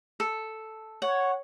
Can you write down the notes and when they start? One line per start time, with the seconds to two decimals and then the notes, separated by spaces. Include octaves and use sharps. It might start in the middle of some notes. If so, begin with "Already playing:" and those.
0.20 A4
1.02 C#5 F#5